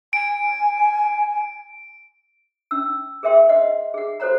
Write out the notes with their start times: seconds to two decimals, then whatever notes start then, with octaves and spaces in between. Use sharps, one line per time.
0.13 G#5 D7
2.71 C#4 E6
3.23 G#4 A#4 E5 G5 C6
3.49 D#5 F#5
3.94 G#4 F#5
4.20 F#4 A4 C5 C#5 F#5 A#5